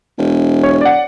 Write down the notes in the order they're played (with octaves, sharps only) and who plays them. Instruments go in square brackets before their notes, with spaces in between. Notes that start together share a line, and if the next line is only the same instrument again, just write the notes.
[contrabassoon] E1
[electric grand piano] C#5
D5 F#5